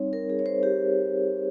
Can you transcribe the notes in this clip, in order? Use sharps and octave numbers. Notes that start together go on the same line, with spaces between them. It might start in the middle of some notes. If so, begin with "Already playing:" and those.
Already playing: G3 C4 D#4 C#5
A#4
G#4
C#5
C5
G4